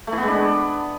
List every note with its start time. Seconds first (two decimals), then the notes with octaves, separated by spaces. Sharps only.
0.07 A3
0.12 E3
0.18 B3
0.23 G#3
0.28 D4